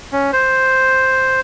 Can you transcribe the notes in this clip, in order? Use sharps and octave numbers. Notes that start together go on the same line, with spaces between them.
C#4
C5